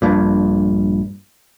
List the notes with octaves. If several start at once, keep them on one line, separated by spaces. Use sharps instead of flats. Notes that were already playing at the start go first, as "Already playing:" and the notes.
A#1 G2 A#2